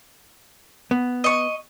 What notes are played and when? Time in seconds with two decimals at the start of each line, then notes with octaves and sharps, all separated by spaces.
0.91 B3
1.24 D#5 C#6